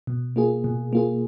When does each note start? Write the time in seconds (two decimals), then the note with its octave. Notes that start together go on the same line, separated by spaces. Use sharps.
0.07 B2
0.36 A#3 F4 G#4
0.64 B2
0.93 A#3 F4 G#4